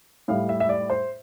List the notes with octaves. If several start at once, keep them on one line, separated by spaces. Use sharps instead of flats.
A2 G3 F5
E5
E5
D5
C5